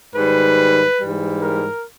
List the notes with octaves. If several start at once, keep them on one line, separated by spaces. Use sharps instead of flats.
G#2 D#3 G3 B4
G#2 E3 G3
A#4